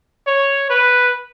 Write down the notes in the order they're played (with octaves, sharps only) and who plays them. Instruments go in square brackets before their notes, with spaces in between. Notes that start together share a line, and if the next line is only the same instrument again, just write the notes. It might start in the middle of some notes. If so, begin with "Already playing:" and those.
[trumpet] C#5
B4